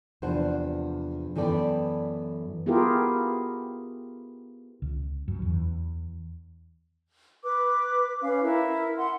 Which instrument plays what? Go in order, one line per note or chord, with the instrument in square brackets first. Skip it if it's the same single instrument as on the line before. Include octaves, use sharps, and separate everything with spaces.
[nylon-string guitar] E2 C3 F3 D4 C5 F#5
F#2 E3 B3 A4 D5 G5
[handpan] B3 E4 F4 G4 G#4 A#4
[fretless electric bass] C#2
F#2
E2
[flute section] B4 D6
C#4 B4 F5
E4 A#4
F#5 C6